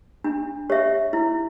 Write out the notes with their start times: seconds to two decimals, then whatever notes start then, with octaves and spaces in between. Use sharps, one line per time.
0.24 D4
0.70 G4 C#5 E5
1.13 E4